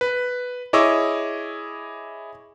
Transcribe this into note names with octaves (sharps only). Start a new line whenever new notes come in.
B4
E4 G#4 C#5 D#5 D6 E6